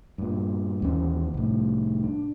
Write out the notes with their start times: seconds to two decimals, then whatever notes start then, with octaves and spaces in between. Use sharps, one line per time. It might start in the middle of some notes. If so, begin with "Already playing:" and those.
0.18 G2 A#2
0.82 D#2 E3 C#4
1.34 C2 A2
2.04 D4